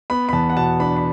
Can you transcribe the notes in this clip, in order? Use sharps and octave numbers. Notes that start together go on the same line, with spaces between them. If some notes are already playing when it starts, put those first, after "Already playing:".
B3 B5
B5
E2 A5
F#5
B2 A5
D4 B5
B5